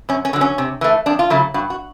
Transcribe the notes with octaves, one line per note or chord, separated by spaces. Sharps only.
F#2 C#4
C#4
D3 F#3
C#4
C3
E3 A3
F2 D4
F4
C#3 F#3 A3 E4
G2 F#4
F#4